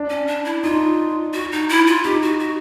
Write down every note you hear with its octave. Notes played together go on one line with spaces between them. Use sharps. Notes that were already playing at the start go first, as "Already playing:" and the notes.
Already playing: D4
C#4
D4
E4
D#4 F4
F#4
D#4
E4
F4
D#4 G4
F#4
F#4